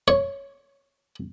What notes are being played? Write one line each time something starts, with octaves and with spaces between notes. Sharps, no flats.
C#5